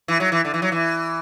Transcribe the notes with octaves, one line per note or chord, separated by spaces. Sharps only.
E3
F#3
E3
D3
E3
F#3
E3